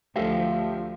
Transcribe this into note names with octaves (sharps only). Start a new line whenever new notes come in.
D2 F3 A3 G4 C5 E5 F5